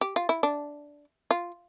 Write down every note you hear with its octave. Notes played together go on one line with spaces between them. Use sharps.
G4
F4
E4
D4
F4